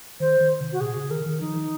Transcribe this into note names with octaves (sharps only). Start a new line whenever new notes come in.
D#3 C5
D#3
C3
F#4
A#2 G#4
C#3
D#3 A#4
D#3
F3 D#4
D#3